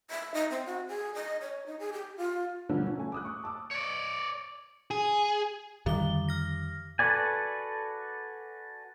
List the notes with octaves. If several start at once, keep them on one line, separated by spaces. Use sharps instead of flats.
E5
D#4
C4
F#4
G#4
D#5
C#5
D#4
G#4
G4
F4
B2 D3 F3 G3 A#3
F#3 C#4
A3 G#5
D6 D#6 F#6
C#6
A5 D6 E6
C#5 D5
G#4
F2 D3 D#3 G3 D6 G7
F6 A#6
F#4 A4 B4 D5 G#5